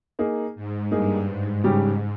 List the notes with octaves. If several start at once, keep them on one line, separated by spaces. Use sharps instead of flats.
A#3 D#4 G#4
G#2
G2 A#3 D#4 G#4
G#2
G#2 C#3 G3 C#4 G4